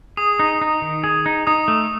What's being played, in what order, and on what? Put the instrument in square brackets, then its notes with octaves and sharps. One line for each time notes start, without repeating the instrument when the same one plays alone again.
[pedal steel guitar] G#4 [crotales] D#6
[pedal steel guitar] D#4
D#4
D#3
G#4
D#4
[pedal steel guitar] D#4 [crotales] D#6
[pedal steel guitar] A3